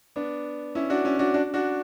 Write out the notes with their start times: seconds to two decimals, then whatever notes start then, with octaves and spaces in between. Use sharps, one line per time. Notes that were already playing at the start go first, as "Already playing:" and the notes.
0.16 B3 D4
0.75 C#4 E4
0.90 D4 F#4
1.05 C#4 E4
1.19 D4 F#4
1.34 D4 F#4
1.54 D4 F#4